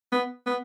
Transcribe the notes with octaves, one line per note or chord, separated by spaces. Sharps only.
B3
B3